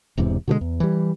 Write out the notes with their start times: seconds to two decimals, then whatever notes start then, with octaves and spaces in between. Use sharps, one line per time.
0.18 E1 E2 G#2 C3
0.48 B2 D3 F#3 G#3
0.61 E2
0.80 E3 G3